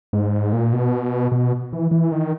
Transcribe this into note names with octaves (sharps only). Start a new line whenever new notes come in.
G#2
A#2
B2
B2
E3
E3
D#3